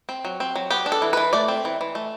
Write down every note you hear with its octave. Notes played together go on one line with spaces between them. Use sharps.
C4
F#3
C4
F#3
B3 G4
D4
A4
E3
E3 B4
A3 D5
C4
E3
E3
A3